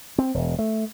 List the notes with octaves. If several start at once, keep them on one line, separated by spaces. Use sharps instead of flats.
C4
E1
A3